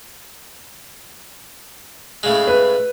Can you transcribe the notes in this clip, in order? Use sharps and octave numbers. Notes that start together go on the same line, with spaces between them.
A2 C#3 G#3
B4